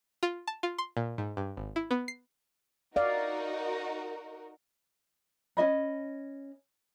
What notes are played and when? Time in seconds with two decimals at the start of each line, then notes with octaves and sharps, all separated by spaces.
0.23 F4
0.47 A5
0.63 F4
0.78 C6
0.97 A#2
1.18 G#2
1.37 G2
1.57 G#1
1.76 E4
1.91 B3
2.08 C7
2.96 D#4 F#4 A#4 D5 F5
5.57 C#4 F#4 D#5 B5